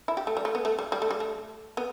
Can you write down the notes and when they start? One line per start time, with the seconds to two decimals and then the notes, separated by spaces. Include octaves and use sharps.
0.08 E4
0.17 G4
0.27 A3
0.37 G3
0.45 A3
0.55 B3
0.65 A3
0.79 G3
0.92 G3
1.02 A3
1.11 G3
1.20 A3
1.77 B3